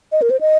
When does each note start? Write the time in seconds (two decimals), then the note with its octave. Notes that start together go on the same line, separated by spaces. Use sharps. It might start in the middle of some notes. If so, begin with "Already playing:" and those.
0.12 D#5
0.22 A#4
0.30 C5
0.41 D#5